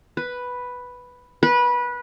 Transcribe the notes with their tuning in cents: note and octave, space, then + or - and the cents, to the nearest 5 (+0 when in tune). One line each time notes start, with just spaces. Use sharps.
B4 +0
B4 -20